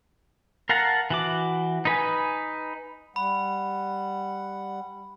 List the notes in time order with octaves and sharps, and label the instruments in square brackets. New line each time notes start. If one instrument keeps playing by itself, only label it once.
[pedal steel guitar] A#4 F5 F#5 A5 A#5
E3 F#4 D6
D#4 B4 G#5
[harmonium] G3 F#5 [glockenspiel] B5